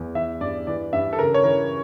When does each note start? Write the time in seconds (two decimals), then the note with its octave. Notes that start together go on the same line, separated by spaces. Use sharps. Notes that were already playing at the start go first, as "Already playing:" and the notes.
Already playing: E2
0.15 E3 E5
0.41 G2 D5
0.67 E3 D5
0.93 G2 E5
1.13 A4
1.19 C#3 A#4
1.34 C#5
1.44 E3 A#4